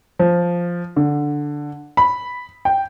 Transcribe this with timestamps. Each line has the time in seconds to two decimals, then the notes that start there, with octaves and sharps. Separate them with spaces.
0.19 F3
0.96 D3
1.97 B5
2.65 G5